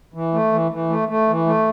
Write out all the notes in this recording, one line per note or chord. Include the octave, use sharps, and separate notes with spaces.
E3
A3
E3
E3
A3
A3
E3
A3